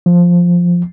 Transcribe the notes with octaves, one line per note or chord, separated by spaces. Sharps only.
F3